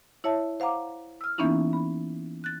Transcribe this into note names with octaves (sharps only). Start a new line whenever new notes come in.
E4 C#5 E5 A5
C5 F5 F#5 A#5 D6
E6 F6
E3 A#3 B3 C#4 D#4 E4
B5
F#6 A6